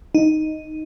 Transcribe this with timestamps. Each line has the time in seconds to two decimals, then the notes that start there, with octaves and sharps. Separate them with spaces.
0.15 D#4